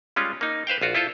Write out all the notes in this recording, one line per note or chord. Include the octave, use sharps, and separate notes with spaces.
G3 G#3 C#4 F4
A#3 D#4
B4 C5 F5 G5
A#1 F4 F#4
E4 F4 A4 C5